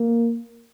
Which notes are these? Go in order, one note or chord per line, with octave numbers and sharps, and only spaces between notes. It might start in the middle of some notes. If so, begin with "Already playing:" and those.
Already playing: A#3